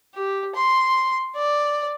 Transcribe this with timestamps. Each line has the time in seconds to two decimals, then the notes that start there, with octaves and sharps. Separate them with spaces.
0.15 G4
0.55 C6
1.36 D5